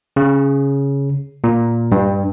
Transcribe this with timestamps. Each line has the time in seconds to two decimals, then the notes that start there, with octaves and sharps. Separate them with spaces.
0.16 C#3
1.44 A#2
1.92 G2